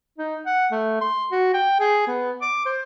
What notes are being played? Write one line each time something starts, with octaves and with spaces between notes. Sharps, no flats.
D#4
F#5
A3
C6
F#4
G5
G#4
B3
D6
C5